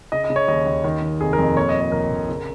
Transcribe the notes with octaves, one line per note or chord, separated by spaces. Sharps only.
C#3 D#5
D#5
C#3
C#5
D#2 D#5
D#2
D#3
D#3
F1 G#4
A#4
F2
A#2 C#5
D#5
A#2
C#5
A#1 A#4
A#1
C#3